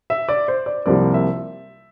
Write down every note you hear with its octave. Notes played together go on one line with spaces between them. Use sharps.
E5
D5
C5
D5
C2 C3 F3 A#3 D5
E5